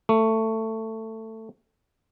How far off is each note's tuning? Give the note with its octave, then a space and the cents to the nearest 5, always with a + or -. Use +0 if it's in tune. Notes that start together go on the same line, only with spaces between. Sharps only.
A3 +15